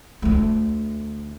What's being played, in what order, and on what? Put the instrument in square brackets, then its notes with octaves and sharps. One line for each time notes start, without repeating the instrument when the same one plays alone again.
[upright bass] D2 A3